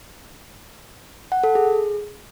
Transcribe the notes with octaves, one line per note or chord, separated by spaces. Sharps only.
F#5
A4
G#4